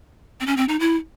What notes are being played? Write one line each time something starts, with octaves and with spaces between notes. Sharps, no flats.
C4
C#4
C4
D#4
E4